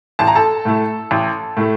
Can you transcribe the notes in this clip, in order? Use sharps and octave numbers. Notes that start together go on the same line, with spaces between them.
A1 A5
A#5
A4 A5
A2 A3
A1
A2 A3